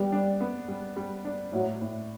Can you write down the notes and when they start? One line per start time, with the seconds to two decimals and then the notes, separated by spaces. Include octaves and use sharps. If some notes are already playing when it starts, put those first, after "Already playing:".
Already playing: G3 B3
0.12 D4
0.40 B3
0.68 G3
0.96 G3
1.25 D4
1.52 A2 F#3
1.81 A2